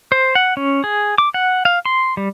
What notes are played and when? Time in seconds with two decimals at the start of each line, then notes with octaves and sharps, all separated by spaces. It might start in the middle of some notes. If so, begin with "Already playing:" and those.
0.12 C5
0.35 F#5
0.57 C#4
0.84 G#4
1.18 D6
1.34 F#5
1.65 F5
1.85 C6
2.17 G3